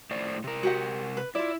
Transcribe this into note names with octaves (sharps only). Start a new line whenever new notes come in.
A2 C5 D5
C3 A#4
F#4 G4 F#5
B4
E4 F4 D5